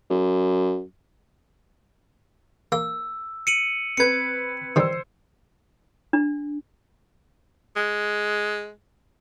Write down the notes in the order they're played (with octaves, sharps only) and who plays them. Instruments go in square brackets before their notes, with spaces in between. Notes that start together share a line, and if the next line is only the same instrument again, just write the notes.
[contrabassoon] F#2
[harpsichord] A#3 [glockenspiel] E6
[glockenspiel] C#7 D#7 F#7
[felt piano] C4 B4 [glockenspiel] G#6 C#7
[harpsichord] D#3 G3 [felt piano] C5 E6
[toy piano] D4
[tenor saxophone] G#3